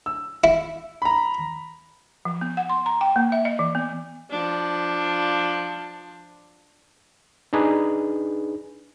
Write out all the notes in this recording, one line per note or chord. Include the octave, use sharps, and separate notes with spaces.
E6
E4
A#5 B5
F3
B3
F#5
C6
A#5
G5
A#3
E5
D#5
E3
B3
F3 D4
D4 D#4 G#4 B4